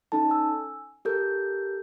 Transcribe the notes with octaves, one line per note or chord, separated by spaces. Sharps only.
C#4 D#4 A4 A5
G#5 E6
G4 A4 A#4 G6